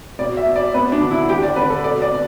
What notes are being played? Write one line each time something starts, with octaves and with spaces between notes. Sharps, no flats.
B2 D5
E5
B2
D5
B3 B4
D4
D3
E4
D3 G4
D5
D3 B4
A4
B2 D5
D5
B2